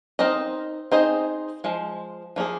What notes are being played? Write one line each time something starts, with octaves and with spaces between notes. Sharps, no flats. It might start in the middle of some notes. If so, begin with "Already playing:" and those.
C4 D#4 A#4 D#5
C4 D#4 G#4 C5 D#5
F3 G#3
F3 A#3 G#4